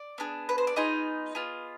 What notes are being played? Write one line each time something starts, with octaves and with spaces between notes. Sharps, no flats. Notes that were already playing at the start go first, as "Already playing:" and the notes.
Already playing: D5
B3 D4 G#4
B4
C5
D5
B3 D#4 F4 G#4 D#5
B3 F4 G#4